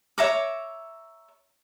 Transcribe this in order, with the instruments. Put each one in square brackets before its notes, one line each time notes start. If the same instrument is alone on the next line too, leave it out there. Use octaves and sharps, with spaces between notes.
[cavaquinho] C#5 E5 A#5 D6